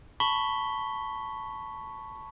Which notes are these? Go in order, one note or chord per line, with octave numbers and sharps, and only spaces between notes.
A5 B5 C#6 B6 G7